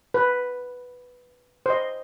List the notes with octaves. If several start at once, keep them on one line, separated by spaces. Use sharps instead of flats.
B4
C5
D#5